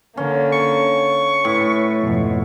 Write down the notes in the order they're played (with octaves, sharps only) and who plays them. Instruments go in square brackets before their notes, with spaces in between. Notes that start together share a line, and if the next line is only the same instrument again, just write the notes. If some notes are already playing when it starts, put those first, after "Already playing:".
[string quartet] D3 A#3 [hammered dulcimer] C#4
[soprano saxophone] C#6
[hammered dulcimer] A2 [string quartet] B4
[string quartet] F2 G#2 B2